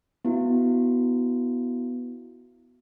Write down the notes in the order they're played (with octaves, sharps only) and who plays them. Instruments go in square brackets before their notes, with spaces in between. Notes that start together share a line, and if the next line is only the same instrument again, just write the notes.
[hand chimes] B3 E4 F#4